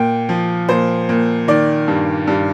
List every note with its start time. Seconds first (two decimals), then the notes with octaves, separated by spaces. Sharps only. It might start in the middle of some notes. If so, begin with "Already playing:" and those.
Already playing: A#2 G5
0.29 F3
0.69 A#2 C5
1.09 A#2
1.48 D#3 D5
1.88 G2
2.27 G2